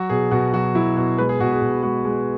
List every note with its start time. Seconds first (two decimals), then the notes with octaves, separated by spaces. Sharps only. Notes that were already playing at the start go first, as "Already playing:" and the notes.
Already playing: F#3 F#4
0.10 B2 G#4
0.31 B2 F#4
0.53 F#3 F#4
0.75 F#3 E4
0.96 B2 F#4
1.18 G#3 B4
1.29 G#4
1.40 B2 F#4
1.52 G#4
1.62 B2
1.83 G#3 F#4
2.05 G#3